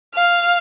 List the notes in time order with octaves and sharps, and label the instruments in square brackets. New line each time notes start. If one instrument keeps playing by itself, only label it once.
[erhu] F5